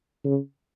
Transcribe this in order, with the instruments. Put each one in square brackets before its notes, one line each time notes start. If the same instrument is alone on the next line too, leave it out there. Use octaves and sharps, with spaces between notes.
[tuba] C#3